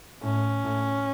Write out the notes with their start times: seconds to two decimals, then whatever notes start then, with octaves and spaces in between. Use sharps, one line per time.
0.23 A2 C#4
0.64 A2